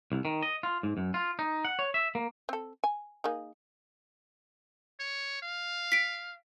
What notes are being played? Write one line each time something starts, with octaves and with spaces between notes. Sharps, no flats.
C2
D#3
D#5
F4
G#2
F#2
F4
D#4
F#5
C#5
E5
A#3
C4 A4
G#5
A#3 D#4 G#4
C#5
F5
B6 D7